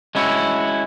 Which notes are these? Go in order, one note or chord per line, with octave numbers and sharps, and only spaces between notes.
G#3 C#4 E4 F#4